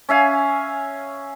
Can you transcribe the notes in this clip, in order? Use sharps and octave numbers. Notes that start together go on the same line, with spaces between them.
C#4 E5 F5 G#5